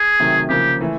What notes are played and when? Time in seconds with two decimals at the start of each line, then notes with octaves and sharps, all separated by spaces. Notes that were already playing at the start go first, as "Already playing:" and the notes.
Already playing: G#4
0.20 C3 D#3 F#3 A3
0.49 C#3 F3 A#3 G4
0.81 E3 A3